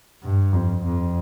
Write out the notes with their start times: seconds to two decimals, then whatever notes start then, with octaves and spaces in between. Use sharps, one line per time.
0.24 G2
0.53 F2
0.84 F2